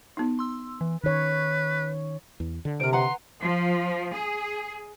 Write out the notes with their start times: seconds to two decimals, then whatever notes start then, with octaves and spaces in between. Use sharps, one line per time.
0.17 B3 D#4
0.39 C6 E6
0.81 E3
1.04 D#3 B4 C#5
2.40 E2
2.65 D3
2.80 C3 A#4 C5 D7
2.93 B4 F#5 A#5 C6
3.41 F3
4.15 G#4